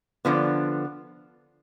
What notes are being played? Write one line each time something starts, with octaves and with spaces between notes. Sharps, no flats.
D3 F3 B3